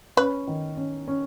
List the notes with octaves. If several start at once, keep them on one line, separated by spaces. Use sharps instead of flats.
C#4 B4
D#3
C#4
C#4